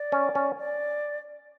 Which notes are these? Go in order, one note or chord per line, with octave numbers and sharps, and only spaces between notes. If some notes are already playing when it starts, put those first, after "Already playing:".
Already playing: D5
C#4
C#4
D5